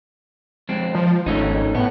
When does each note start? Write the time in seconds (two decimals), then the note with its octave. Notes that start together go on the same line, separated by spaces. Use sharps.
0.69 F2 G#3 C4
0.95 F3
1.26 G#1 A3 C#4 D#4
1.75 A2 B3